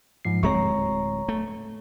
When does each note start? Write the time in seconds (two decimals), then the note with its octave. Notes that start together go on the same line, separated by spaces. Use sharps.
0.25 G#2 F3 C7
0.43 D1 G#3 C4 C#5 A#5 C#6
1.29 A3